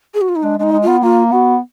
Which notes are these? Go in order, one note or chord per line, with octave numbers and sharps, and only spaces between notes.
G#4
F#4
F4
D#4
G#3 D4
G#3 D4 D#4
G#3
B3 F4
A#3 F4
B3 F#4